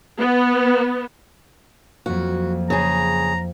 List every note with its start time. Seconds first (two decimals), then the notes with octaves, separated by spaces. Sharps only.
0.19 B3
2.06 F2 F#3 A#3 F#4
2.70 C#3 G#4 A#5